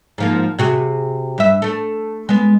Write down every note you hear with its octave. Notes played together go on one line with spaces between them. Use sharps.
G#2 F3 A#3
C3 F#4 G#4
G2 E5
A3 A4
G#3 B3